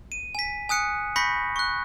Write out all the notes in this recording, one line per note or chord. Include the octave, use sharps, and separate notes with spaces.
D#7
G#5 B6
G#5 D#6 F#6 C#7
B5 C#6 G6 A#6 B6 C#7
C#6 F#6